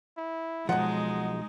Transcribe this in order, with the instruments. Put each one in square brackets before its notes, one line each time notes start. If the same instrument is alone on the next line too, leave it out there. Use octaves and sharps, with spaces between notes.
[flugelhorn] E4
[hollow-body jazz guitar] B1 F3 [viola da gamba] G#3 [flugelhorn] D#4 [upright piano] F#5